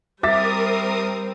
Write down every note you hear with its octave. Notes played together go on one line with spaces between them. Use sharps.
G3 C4 A#4 E5 D6 D#6 A6 B6